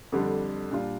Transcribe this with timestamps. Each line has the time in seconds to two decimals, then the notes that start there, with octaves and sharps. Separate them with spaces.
0.12 F2 D3 G3 D4
0.71 A#2 G3 D4 F4